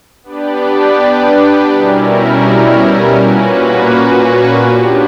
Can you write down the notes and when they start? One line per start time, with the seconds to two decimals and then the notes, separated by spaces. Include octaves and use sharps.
0.23 B3 D4 G4 B4 D5
1.69 B2 G3 C#4 E4 A#4
3.15 A#2 A#3 C#4 F#4 B4
4.61 B3 D4 G4